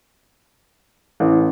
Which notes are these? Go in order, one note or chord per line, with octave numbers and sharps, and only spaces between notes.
A1